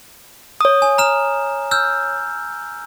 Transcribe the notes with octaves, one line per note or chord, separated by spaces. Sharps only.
C#5 D#6
G#5
A#5 F6 E7
E6 F6 G6